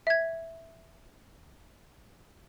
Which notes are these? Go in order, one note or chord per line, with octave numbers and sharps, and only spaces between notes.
E5 G#6